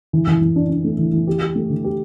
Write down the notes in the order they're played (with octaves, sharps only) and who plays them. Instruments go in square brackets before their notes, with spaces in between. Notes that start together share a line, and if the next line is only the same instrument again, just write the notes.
[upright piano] E3
E3
E3
D4
D4
A3
E3
E3
G4
G4
A3
D3
G4